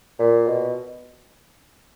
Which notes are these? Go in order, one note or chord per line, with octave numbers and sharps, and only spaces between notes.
A#2
B2